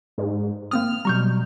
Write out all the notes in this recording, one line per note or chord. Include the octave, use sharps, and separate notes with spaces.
G#2
A#3 C4 D#6 F6
B2 F#3 G3 A#5 C#6 G6